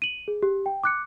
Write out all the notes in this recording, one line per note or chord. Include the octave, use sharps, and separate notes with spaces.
D#7 F#7
G#4
G4
G5
D6 F#6 C#7